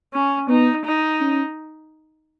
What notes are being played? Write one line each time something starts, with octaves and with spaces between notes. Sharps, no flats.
C#4
B3 D#4
D#4
C#4